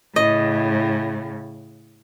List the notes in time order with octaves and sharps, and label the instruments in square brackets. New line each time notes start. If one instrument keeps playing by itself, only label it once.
[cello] A2 C#3 [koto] D#5